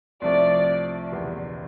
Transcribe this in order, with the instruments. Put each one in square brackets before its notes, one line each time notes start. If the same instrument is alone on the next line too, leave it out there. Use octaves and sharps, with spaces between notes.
[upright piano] C2 C3 F3 A3 [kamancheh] D5
[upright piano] F#1 E2 B2 G3 B3